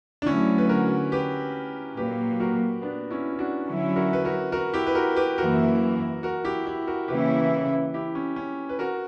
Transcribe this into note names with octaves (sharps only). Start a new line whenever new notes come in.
D4
D2 D3 F#3 C#4 E4
B4
F#4 A#4
G4 B4
A#2 F#3 A#3 G4 B4
F#4 A#4
B3 D4
C#4 E4
E4
D4 F#4
D3 F#3 C#4 E4
F#4 A#4
B4
F#4 A#4
F#4 A#4
E4 G4
B4
F#4 A#4
G4 B4
F#2 E3 A#3 E4 F#4 A#4
F#4 A#4
E4 G4
E4 G4
F#4 A#4
C#3 E3 A#3 C#4 E4 G4 B4
E4 G4
C#4
C#4
B4
F#4 A#4